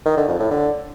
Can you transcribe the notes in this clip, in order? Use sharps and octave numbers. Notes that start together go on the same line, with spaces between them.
D#3
D3
F2
A2
D3